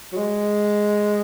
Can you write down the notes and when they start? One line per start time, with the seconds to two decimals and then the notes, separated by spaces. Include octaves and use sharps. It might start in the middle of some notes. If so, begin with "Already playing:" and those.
0.12 F#3
0.17 G#3